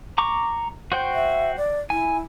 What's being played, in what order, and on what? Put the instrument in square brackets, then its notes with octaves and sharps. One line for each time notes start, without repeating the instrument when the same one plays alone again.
[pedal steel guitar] A#5 C#6 D6
F#4 C5 G5
[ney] E5
D5
[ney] E4 [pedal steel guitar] G#5